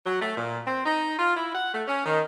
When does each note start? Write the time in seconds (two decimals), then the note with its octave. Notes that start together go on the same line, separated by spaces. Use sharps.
0.06 F#3
0.21 A3
0.37 A#2
0.66 C4
0.85 D#4
1.19 F4
1.36 E4
1.55 F#5
1.74 A3
1.88 C#4
2.05 D#3